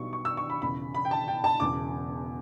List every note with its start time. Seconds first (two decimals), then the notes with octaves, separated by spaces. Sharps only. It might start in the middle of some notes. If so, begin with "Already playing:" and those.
Already playing: B1 B2 G3 B3 C#6
0.13 C#6
0.25 E6
0.37 C#6
0.50 B5
0.62 E1 E2 C#3 B5
0.95 B5
1.05 G5
1.11 A5
1.28 G5
1.44 A5
1.60 E1 E2 C#3 D6